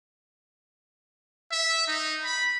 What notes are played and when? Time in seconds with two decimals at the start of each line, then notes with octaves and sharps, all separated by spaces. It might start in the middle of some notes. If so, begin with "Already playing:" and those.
1.52 E5
1.87 D#4
2.24 B5